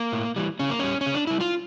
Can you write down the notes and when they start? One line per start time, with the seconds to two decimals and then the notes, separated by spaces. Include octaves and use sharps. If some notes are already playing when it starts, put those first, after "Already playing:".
Already playing: A#3
0.13 A2
0.36 E3 G3
0.59 C#3 C#4
0.70 A#3
0.79 G3 C#4
1.01 C#4
1.06 C#3
1.14 D4
1.27 G3 E4
1.41 F4